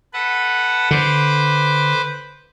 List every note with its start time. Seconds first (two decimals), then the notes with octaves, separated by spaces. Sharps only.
0.13 A4 B4 F#5
0.91 D3 B4 C5 D6